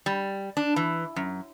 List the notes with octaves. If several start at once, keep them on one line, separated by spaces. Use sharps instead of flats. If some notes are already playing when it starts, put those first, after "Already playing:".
G3
D4
E3
F#2